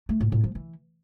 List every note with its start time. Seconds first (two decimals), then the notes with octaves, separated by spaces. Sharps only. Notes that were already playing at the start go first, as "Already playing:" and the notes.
0.09 A3
0.21 A2
0.32 A2
0.44 F3
0.55 E3